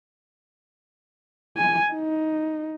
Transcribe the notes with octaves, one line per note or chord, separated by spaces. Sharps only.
G#5
D#4